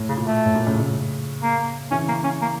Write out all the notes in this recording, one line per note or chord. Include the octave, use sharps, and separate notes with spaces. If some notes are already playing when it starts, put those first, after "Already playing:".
Already playing: A2
C#3
A#2
A3
A2
A#2
A2 C#3
A2 C#3
A#3
C#3 E3 C#4
A#3
C#4
A#3